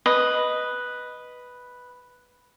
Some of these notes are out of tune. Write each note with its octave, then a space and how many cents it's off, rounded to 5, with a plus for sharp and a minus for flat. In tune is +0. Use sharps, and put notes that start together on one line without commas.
B4 +0 D#5 +0 D#6 +0